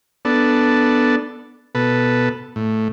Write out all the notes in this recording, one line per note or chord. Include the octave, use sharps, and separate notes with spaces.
B3 D4 A4
B2 A4 B4
A2